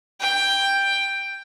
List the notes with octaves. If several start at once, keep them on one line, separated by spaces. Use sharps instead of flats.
G5